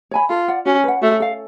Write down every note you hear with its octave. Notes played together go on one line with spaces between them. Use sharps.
C#5 G#5 B5
F4 A4
D5 F#5
C#4 F#4
B4 F#5
A3 F#4
A4 F5